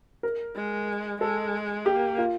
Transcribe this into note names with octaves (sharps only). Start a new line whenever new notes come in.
A#4
G#3
G#3 A4
A#3 G4
F4